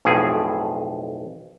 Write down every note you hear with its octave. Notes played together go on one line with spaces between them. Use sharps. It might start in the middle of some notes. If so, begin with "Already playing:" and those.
B1 F2 A2 G#4